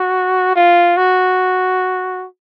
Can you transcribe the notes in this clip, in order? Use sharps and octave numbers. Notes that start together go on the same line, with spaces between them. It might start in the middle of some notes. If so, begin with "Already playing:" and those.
Already playing: F#4
F4
F#4